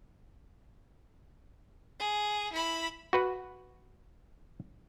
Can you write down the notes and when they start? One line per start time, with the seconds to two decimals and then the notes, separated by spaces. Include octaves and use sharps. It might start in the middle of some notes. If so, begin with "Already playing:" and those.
2.00 G#4
2.53 E4 B5
3.13 F#4 B4 F#5